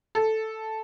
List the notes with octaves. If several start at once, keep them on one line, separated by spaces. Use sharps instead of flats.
A4